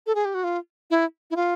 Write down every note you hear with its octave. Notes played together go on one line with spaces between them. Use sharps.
A4
G#4
G4
F#4
F4
E4
E4
F4